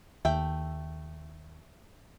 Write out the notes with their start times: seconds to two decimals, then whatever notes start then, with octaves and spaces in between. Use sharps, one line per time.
0.25 D#2 A3 E5 G5